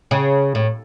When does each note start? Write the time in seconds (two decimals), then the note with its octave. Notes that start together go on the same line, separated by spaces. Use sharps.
0.11 C#3
0.55 A2